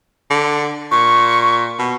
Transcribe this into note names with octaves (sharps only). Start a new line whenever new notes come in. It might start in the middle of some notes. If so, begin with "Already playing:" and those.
D3
A#2 C#6
B2